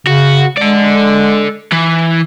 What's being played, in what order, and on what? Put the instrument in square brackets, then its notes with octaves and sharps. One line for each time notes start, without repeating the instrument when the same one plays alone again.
[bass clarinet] C#3 [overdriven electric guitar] F#4
[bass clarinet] G#3 [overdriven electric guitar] A4 D5
[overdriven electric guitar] E3